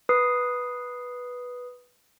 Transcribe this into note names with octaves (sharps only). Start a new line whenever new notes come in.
B4 D#6 C7